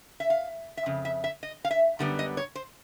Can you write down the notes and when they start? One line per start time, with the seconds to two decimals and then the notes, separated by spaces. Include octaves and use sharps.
0.20 E5
0.30 F5
0.77 E5
0.86 F2 C#3
1.05 E5
1.24 E5
1.43 D#5
1.65 F5
1.71 E5
1.99 F#2 D3 G3 B3 D4
2.19 D#5
2.37 C#5
2.55 C5